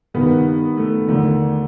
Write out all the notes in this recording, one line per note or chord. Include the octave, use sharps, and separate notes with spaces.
G2 D#3 B3
A3
D#2 D3 A3